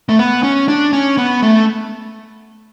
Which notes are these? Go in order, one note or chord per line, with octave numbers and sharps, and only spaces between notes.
A3
B3
C#4
D4
C#4
B3
A3